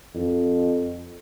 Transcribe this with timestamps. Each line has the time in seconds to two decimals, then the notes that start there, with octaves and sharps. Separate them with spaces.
0.15 F2